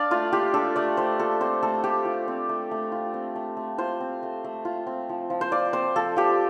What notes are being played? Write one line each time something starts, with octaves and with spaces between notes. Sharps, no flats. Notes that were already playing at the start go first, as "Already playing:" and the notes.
Already playing: D4 D5 F5
A3 F4
F4 G4
D4 A4
A3 D5
A3 C5
F4 A4
C4 C5
A3 A4
A3 G4
F4
C4
A3
A3
F4
C4
A3
A3
F4 C5
C4
A3
A3
F4
C4
F3
F3
C5
F4 D5
C4 C5
F3 A4
F3 G4